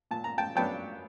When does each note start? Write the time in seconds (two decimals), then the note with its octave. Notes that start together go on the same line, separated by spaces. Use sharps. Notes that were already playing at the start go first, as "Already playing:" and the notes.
0.11 A#2 A5
0.24 A#5
0.38 G5 A5
0.55 F#3 B3 D4 G5 A5